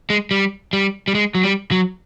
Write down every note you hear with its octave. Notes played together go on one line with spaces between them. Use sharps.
G#3
G3
G3
G3
G#3
F#3
G3
F#3